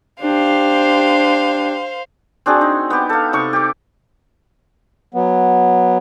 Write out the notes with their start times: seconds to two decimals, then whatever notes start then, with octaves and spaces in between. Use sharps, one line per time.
0.21 D4 G4 C5 F5
2.46 C4 D4 F#4 G#4
2.61 D#4
2.90 B3 G4
3.09 A4 F5
3.33 C3 D#4 C#6
3.53 G4 D6
5.14 F#3 B3